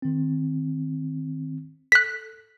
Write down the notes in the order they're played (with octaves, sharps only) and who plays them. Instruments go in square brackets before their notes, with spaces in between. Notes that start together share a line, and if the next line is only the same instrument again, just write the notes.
[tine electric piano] D#3 C4
[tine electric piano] A4 [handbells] F#6 B6